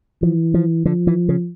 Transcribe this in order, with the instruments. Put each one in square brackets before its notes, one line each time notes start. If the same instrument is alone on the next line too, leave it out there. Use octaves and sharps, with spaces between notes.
[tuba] E3 [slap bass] F3
[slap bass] F3
[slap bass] D3 [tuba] F3
[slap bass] E3
C#3